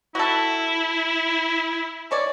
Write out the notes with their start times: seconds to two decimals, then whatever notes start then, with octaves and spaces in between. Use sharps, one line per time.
0.15 E4 F#4 A4
2.11 G#3 C#5 D5